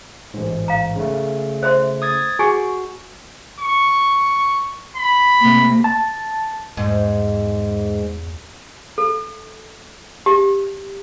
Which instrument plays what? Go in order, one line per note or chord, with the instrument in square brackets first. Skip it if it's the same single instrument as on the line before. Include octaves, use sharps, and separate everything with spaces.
[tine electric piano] A1 G#2
[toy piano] F5 A#5
[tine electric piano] C#3 A3
[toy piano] C5 E5 C6
[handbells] D#6 G#6 A6
[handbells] F#4 [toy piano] G#4 G#5 C#6
[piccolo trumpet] C#6
B5
[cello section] C3 A3 A#3
[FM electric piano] A5
[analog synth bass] E2 [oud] G#2
[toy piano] A4
G4